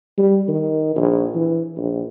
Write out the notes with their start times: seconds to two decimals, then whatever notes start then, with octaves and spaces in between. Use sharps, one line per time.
0.18 G3
0.48 D#3
0.96 A#1
1.35 E3
1.77 A#1